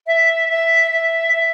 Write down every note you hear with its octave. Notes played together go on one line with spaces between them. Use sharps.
E5
E5
E5
E5